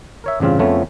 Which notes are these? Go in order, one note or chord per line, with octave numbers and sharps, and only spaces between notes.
A#4 C#5 E5
A1 G2 C#3 C4 F4
F2 C#3 F3 A3 B3 C#4